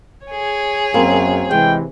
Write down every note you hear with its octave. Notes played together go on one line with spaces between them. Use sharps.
G#4 C#5
F#2 A#3 C4
C3 E3 G#3 G5